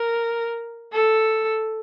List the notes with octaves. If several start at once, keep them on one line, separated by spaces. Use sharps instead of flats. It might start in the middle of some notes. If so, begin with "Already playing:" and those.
Already playing: A#4
A4